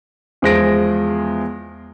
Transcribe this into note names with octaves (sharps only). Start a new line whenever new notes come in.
E2 F3 G#3 C5 A#6 D7